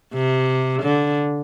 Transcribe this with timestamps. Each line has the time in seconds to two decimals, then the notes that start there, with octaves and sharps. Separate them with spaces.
0.14 C3
0.83 D3